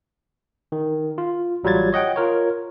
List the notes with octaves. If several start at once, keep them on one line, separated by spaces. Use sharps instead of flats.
D#3
F4
A1 F#3 G3 F4 G#6 A6
C#5 D#5 F#5 G5
F4 A#4 C#5